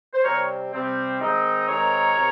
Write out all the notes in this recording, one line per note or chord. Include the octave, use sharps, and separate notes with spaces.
C5
C3 G3 C4 A#4 C#5
C3 G3 C4
D#3 G#3 C4 D#4
D#3 G#3 C4 D#4 A#4 C#5
C3